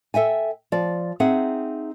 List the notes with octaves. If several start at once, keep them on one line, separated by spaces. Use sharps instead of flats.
A4 E5 G5 G#5
F3 D5
C4 D#4 G#4 E5 F#5